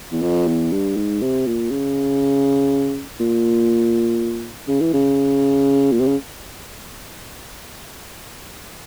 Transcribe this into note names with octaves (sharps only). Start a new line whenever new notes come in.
E2
F2
E2
G2
G#2
C3
A#2
C#3
A#2
C#3
E3
C#3
A#2
C3
C#3